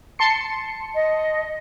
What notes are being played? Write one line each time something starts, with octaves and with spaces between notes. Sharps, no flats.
A5 C6 C#7
D#5